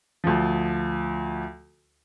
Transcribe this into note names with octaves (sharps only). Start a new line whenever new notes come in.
D2 F3